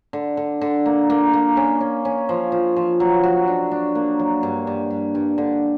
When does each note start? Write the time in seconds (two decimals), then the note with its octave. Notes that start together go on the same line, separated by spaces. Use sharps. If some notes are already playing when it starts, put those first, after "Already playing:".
0.13 D3
0.37 D3
0.61 D3
0.86 A#3
1.10 A#3
1.33 A#3
1.57 C#4
1.80 C#4
2.05 C#4
2.29 F3
2.52 F3
2.76 F3
3.00 F#3
3.24 F#4
3.48 D4
3.71 D4
3.95 A#3
4.19 F#3
4.43 G2
4.67 G2
4.90 G2
5.15 G2
5.38 D3